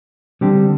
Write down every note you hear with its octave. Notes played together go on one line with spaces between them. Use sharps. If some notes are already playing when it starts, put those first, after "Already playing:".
D3 G3 C4 G4